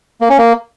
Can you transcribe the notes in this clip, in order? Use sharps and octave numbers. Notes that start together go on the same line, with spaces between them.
A#3
C#4
A#3